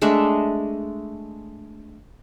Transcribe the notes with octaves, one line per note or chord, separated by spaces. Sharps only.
G#3 A3 D4 E5